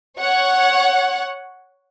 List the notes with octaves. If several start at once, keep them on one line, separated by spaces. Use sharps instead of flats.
C#5 F#5